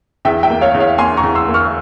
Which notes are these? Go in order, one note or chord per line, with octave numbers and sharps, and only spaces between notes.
E2 E5 G5
E5 G5
A#3
C#5 F5
E2
C#5 F5
A#3 G#5 C6
A#5 C#6
E2
C6 E6
A#3
C#6 F6